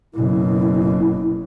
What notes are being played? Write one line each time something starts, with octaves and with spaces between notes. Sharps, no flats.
F#1 B2 E4